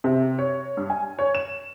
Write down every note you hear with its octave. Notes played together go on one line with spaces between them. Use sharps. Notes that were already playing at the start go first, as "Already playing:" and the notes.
C3
C#5
G2
G#5
C#5
E7